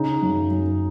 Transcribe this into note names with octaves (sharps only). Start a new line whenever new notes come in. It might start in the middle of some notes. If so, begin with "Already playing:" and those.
Already playing: C#3 D#4
F#2
F#2